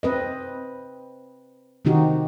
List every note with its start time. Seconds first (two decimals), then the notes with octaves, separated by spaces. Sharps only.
0.03 C4 B4 D#5
1.85 C3 D#3 C4 D#4 F#4 G4